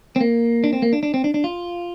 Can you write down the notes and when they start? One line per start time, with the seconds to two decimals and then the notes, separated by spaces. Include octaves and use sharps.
0.16 C4
0.20 A#3
0.64 D4
0.73 C4
0.82 A#3
0.93 D4
1.03 D4
1.14 C4
1.24 D4
1.34 D4
1.44 F4